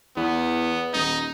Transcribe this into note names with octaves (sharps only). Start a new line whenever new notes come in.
E2 B3
D#1 D#4